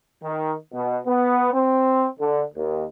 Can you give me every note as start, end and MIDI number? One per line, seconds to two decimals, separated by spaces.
0.22 0.52 51
0.72 0.97 47
1.05 1.49 59
1.52 2.06 60
2.19 2.42 50
2.54 2.83 39